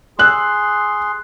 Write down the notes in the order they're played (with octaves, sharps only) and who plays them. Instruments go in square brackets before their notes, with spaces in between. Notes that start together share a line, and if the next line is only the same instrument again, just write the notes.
[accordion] G#4 C6 [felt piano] E6 F#6